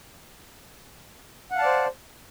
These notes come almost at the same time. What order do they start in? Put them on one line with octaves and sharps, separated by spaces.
F#5 F5 A5 D5 C5